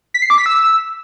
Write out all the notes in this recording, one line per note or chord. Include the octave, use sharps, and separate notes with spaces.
B6
C7
D6
B6
E6